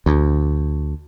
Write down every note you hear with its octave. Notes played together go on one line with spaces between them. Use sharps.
D2